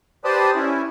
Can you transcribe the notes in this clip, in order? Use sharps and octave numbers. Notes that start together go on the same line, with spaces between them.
G4 B4 C5 D5 A5 D#6
C#4 E4